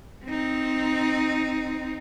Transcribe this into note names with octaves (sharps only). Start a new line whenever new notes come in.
C4 D#4